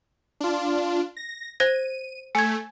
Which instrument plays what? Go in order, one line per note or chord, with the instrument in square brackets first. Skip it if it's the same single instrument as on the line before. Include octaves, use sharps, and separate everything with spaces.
[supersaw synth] D4 F4
A#6
[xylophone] C5 G#6 A#6 [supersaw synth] D#7
[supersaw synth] A3 [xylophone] G#5 G#6